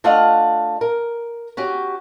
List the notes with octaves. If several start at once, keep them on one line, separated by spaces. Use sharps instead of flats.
A3 D4 F4 D#5 F5 F#5
A#4
C#4 F#4 G4